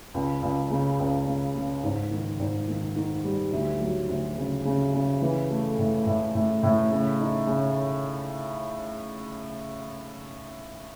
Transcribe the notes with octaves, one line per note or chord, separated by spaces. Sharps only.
C#2
C#2
C#3
C#2
C#3
C#3
G#2
D#3
G#2
D#3
D#3
G3
D2
F#3
D2
C#3
C#3
C#3
E3
A3
A2
A2
A2
A2
C#3
D#4
C#3